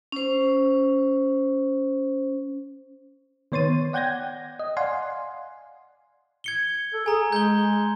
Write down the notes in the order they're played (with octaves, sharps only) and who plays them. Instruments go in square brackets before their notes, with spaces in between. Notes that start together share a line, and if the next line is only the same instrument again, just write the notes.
[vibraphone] C#4 C5
[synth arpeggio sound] D#3 B3 C#5 C6 A6 D#7
D5 F#5 G5 G6 G#6 A#6
D#5
D5 F5 F#5 G#5 C6
[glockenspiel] G#6 C#7 G7
[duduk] A4
[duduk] G#4 [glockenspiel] G#5 A#5
[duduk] G#3 [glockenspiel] G6 G7